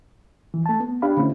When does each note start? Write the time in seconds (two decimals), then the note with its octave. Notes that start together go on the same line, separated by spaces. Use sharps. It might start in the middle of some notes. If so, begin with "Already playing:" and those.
0.54 E3
0.66 A3 A5
0.80 B3
1.02 D4 G4 F5 B5
1.17 D3 A3 C4 C#4 E4